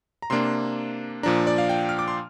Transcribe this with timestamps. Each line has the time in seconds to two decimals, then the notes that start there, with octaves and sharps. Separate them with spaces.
0.22 A#5
0.30 C3 A#3 D4 C6
1.23 A#2 F3 D4 A#5
1.47 D5
1.58 F5
1.69 G5
1.89 F6
1.99 D6
2.08 C6